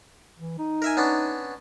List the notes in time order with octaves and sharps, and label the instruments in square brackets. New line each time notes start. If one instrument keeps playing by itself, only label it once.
[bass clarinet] E3
D#4
[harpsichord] A#4 E5 G#5
B3 C#4 D4